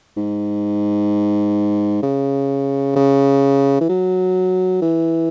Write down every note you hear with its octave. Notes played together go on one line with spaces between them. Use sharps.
G#2
C#3
C#3
E3
F#3
E3